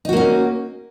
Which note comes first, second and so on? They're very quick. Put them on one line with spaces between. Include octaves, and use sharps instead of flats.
D#4 F#4 A#3 C#4